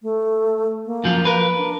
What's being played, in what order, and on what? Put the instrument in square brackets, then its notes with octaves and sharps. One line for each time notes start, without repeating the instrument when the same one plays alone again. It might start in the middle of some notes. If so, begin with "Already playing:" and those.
[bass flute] A3
A#3
[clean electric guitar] F#2 F3 F4
A#4 B4
[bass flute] D4